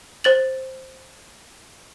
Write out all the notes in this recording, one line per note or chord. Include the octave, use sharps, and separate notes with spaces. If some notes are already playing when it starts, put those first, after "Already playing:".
C5 A6 F#7